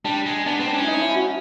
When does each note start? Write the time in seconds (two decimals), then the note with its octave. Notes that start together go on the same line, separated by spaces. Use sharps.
0.04 G3 D4
0.26 G#3
0.46 B3 D4
0.60 C4
0.67 D4
0.74 C#4
0.81 E4
0.87 D#4
1.01 E4
1.15 F#4